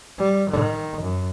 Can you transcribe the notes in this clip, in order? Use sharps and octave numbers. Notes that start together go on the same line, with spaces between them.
G3
D#3
F#2